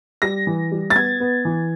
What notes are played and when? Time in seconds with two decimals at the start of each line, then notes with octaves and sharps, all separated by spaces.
0.22 G3 A#6
0.47 E3
0.72 G3
0.90 A6
0.96 B3 G#6
1.20 B3
1.45 E3